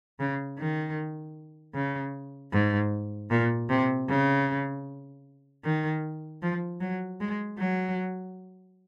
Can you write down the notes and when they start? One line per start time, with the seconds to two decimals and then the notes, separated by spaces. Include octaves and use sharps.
0.19 C#3
0.58 D#3
1.75 C#3
2.52 G#2
3.30 A#2
3.69 C3
4.09 C#3
5.64 D#3
6.42 F3
6.81 F#3
7.20 G#3
7.59 F#3